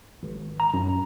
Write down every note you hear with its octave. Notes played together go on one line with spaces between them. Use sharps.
G#1
A#5
F#2